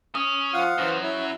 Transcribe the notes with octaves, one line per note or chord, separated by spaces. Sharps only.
C#4 D#6
F3 F4 F5 F#5
F#2 E3 F#3 C5
E4 C#5